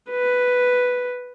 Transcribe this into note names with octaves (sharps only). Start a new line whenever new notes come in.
B4